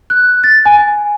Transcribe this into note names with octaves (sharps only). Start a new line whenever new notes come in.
F#6
A6
G#5